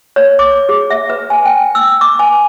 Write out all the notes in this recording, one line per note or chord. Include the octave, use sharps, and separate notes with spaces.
C#5
D6
G#4
E5
B4
G#5
G5
E6
D6
G#5